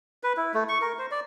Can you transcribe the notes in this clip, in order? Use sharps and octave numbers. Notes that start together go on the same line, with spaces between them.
B4
E4
A3
C#6
A#4
C5
D5